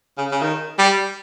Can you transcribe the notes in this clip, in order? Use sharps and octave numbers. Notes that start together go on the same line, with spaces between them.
C#3
C#3
D#3
G3